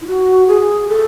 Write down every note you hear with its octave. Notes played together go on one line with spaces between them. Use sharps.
E4
F#4
G#4
A4